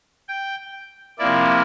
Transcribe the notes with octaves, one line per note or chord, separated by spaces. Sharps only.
G5
C3 F3 A#3 E4 D5